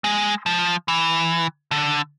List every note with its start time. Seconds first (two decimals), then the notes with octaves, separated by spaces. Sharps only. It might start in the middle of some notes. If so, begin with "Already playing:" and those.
0.04 G#3
0.46 F3
0.88 E3
1.71 D3